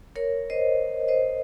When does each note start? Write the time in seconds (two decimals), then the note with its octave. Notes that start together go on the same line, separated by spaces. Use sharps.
0.16 A#4 C#5
0.50 C5 D#5
1.08 C5 D#5